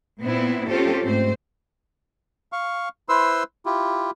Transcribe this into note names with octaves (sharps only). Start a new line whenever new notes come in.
A#2 B3 C4 E4
C4 C#4 F4 G4 A4 C5
G#2 A3 C4 C5
F5 C#6
E4 B4 C5 C6 E6
E4 F4 G4